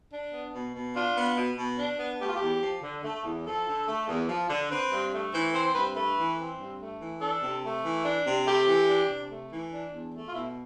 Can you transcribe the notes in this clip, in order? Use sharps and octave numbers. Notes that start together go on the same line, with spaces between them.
D4
B3
B2
B2
D4 F4
B3
B2
B2
D4
B3
A3 G4
F4
G4
E2
F3
D3
A3
E2
F3 A4
D3
A3
E2
F3
D3
C4 B4
G2
A3
E3 C5
C4 C5
C5
G2 B4
A3 B4
E3
C4
G2
A3
E3
D4 A4
C3
A3
E3
D4
C3
A3 G4
E3
D4
C3
A3
E3
D4
E2
A3
F4
B2 E4